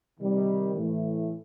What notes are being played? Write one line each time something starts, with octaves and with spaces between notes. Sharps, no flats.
C3 D#3 G3
A2 E3 A3